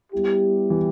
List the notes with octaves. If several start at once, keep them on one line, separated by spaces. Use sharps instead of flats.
G3 B3 E4 G4
E3